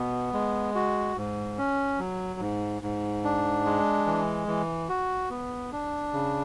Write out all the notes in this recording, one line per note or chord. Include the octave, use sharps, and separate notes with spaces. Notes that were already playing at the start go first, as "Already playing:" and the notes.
Already playing: B2 B3
G#3
F#4
G#2
C#4
F#3
G#2
G#2
D4
G#3
E3
E3
F#4
B3
D4
C#3